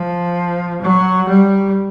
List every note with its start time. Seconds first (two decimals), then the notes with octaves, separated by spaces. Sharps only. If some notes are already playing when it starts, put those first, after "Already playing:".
Already playing: F3
0.81 F#3
1.28 G3